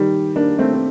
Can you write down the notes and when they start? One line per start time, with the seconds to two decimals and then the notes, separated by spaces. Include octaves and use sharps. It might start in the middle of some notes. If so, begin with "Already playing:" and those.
Already playing: D#3 G3
0.36 A#3 D4
0.59 A3 C4
0.73 C4